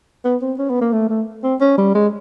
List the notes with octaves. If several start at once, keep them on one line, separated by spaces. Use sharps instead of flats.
B3
C4
C#4
B3
A#3
A3
A3
C4
C#4
G3
G#3